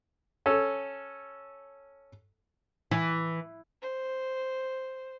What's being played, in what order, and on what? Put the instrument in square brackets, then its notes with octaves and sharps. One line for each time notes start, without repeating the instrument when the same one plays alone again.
[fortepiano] C#4 A4
[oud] E3
[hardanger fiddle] C5